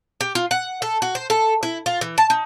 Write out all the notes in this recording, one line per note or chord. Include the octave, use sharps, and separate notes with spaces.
G4
F4
F#5
A4
F#4
C5
A4
E4
F4
E3
A5
D#4